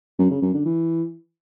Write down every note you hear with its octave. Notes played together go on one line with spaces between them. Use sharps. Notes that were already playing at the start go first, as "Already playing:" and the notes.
F#2
C#3
F#2
D3
E3